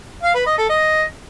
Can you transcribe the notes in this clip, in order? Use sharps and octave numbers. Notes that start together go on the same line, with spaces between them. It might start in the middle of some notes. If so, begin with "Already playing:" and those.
F5
B4
D#5
A4
D#5